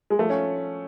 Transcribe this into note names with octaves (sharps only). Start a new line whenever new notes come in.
G#3
F3 A3
C#4